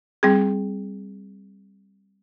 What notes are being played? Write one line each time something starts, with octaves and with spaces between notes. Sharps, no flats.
G3 C4 G#4